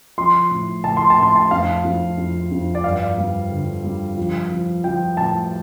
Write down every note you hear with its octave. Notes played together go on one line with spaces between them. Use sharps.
F3 C6
A2
A2 A5
C6
A5
A2 C6
A5
F2 F5
F2
F2
F2
D5
G2 F5
G3
D3
G3
F3
F3
F3 G5
A2 A5